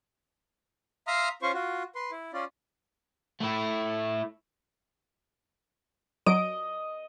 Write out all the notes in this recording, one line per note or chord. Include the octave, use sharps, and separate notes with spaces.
E5 F5 A#5 C6 D#6 F6
C#4 F4 C5 C#6
F4 F#4
B4 C6
E4
C#4 F4 D5
A3 E4
F#3 D#5 D7